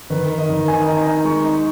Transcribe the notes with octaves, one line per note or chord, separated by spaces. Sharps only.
D#3 B4
D#4
D#5
D#3
D#4 G#5
D#4
A#5
D#4
G#3 C#6
D#4